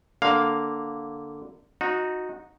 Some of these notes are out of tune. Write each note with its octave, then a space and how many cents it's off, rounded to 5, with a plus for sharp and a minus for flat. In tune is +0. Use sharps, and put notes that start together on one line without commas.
D3 +0 A#3 +0 F5 +5
D#4 +0 F#4 -20